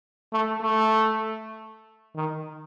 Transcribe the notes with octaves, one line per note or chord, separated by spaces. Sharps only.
A3
A3
D#3